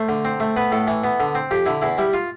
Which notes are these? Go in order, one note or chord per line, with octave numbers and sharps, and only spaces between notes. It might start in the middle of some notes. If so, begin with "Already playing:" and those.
Already playing: A3 C5
D3
C4
A3
B3 B4
A2 A4
E3
B3
D3
C4
F2 G4
D3 E4
E2 E4
G3 E4
F4